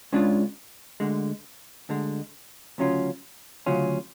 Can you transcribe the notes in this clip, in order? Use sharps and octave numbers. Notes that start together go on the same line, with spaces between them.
C#2 C#3 G#3 D4 F4
D2 D3 G#3
D2 D3 G#3
D2 C#3 F#3 C#4 F4
D2 C#3 F#3 C#4 F4